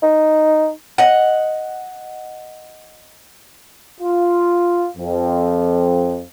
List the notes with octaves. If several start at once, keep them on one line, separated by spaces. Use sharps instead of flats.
D#4
D#5 F#5
F4
F2